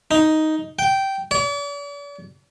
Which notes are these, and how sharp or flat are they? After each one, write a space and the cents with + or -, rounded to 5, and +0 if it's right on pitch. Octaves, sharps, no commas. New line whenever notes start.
D#4 +5
G5 -10
D5 -45